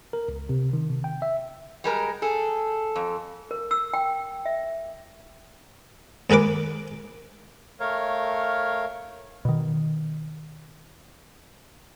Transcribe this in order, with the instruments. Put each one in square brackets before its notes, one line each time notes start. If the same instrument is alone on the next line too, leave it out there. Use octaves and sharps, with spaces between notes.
[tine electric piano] A#4
C#2
C3
D#3
C3
G5
E5
[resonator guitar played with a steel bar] G3 G#3 A#4
[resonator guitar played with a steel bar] G#4 [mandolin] A4
[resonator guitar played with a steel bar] F2
[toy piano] A#4
E6
G5
E5
[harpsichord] D#2 G#3 A#4 B4 D6
[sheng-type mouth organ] A3 A#4 C#5 F5
[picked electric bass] B2 D#3